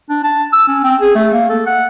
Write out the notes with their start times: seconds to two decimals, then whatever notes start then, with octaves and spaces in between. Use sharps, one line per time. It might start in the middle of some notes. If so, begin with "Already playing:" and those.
0.10 D4
0.24 A5
0.53 E6
0.68 C#4
0.84 C4
1.01 G#4
1.15 A3
1.33 A#3
1.50 A4
1.67 F#5